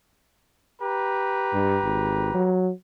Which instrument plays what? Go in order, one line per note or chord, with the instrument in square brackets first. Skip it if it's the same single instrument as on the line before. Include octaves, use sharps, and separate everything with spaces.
[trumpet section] G4 B4 A#5
[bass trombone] G2
G#1
F#3